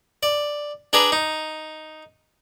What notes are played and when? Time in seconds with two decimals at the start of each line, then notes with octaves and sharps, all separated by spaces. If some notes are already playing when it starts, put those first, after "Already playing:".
0.23 D5
0.93 D4 G#4 B4 D5 A#5
1.12 D#4